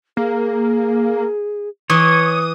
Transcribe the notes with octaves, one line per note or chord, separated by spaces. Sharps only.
A#3 G#4
E3 C#5 D#6